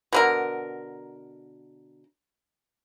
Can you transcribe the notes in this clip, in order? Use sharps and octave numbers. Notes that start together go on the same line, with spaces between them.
B2 D3 A#4